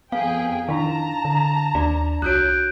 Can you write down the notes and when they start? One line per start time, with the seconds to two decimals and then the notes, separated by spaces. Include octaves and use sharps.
0.12 F2 B3 G#4 F5 G5
0.69 D#3 D4 E4 A5 A#5
1.25 D3
1.75 D#2 D4 D5
2.22 C2 F4 F#4 C#5 F#6 G6 D7